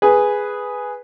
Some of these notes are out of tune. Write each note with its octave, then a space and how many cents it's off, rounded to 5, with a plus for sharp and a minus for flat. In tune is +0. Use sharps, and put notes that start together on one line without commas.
G#4 +0 B4 +0